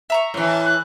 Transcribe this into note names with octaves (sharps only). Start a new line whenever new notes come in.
E5 A#5 C#6
A2 E3
A5
F#6